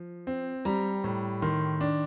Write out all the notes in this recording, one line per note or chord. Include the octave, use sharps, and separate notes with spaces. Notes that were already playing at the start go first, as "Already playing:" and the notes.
Already playing: F3
C4
G3 A#5
A2
D#3 C6
D4